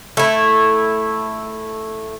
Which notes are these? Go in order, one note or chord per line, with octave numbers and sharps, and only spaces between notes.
A3 E4